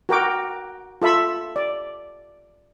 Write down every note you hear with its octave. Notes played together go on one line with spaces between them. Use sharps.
F#4 A#4 G5 D6
F4 A4 E5 B5 E6
D5